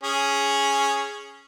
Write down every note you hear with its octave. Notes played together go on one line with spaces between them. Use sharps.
C#4 G#4